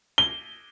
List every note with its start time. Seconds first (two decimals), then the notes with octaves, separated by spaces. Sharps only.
0.18 G7